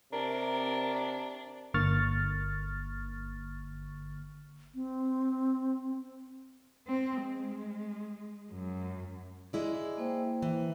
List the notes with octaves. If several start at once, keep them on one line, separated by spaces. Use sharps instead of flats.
C3 D4 A#4
G1 D3 A#3 C#6 F6 A6
C4
C4
G#3
F#2
G#3 E4 D5 D#5
A#3 C5 G5
E3